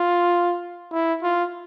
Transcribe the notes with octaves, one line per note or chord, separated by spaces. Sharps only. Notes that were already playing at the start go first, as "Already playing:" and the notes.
Already playing: F4
E4
F4